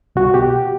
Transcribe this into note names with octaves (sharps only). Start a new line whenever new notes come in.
C2 F#4
B2 G4